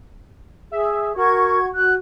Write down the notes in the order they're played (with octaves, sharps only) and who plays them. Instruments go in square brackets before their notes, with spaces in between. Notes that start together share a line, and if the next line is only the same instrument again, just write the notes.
[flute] G#4 [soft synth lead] E5
[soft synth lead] F#4 [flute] A#4 [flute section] C#6 G#6
[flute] F#6